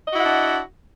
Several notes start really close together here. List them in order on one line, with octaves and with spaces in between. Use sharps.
D#5 F#4 E4 F#5 D4